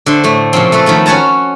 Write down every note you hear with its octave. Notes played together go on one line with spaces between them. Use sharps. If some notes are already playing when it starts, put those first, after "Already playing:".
D3 A3 C5
A2 A3
A#2 C#3 F3 C4
A3 A4 B4
D#3 F3 A3 B3
C#4 F#4 C#5 A5 A#5